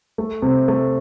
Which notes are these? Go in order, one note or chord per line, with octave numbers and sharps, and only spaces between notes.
A3
C3
A3